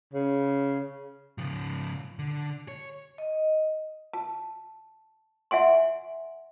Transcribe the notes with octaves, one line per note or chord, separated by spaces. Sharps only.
C#3
C#3 F3
D3
C#5
D#5
A5
E5 F#5 G#5 C6